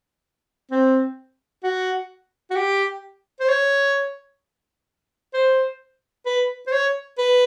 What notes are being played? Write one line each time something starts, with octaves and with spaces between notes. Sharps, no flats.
C4
F#4
F#4
G4
C5
C#5
C5
B4
C5
C#5
B4